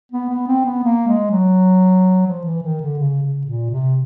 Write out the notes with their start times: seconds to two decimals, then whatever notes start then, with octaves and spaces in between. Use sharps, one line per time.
0.12 B3
0.30 B3
0.48 C4
0.65 B3
0.84 A#3
1.07 G#3
1.31 F#3
2.27 F3
2.45 E3
2.63 D#3
2.81 D3
2.99 C#3
3.23 C#3
3.47 A#2
3.71 C3